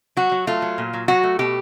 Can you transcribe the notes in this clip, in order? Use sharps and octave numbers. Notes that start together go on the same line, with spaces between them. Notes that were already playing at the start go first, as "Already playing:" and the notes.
F#3 F#4
F#3
A3 F4
F#3
A#2
F#3
F#3 F#4
A3
B2 G4